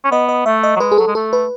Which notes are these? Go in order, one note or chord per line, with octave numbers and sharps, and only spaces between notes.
C#4
B3 D#5
D#5
A3 E5
D#5
F#3
G#3 B4
G#4
F#3 A4
G#3
A3 A4
B4